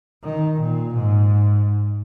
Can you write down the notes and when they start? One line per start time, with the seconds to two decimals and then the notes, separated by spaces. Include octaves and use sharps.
0.24 D#3
0.61 A#2
0.95 G#2